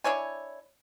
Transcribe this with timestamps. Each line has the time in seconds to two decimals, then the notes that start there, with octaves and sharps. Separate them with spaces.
0.04 D4 E4 C#5 G#5